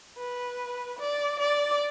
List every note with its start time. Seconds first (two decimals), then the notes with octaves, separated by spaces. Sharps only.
0.18 B4
0.99 D5
1.40 D5